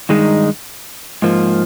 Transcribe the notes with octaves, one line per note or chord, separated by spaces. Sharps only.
G2 D#3 G#3 D#4
G#2 F3 A#3